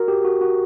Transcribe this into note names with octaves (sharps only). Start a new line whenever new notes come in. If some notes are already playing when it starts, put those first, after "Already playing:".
Already playing: F#4 A#4
G4
F#4
F#4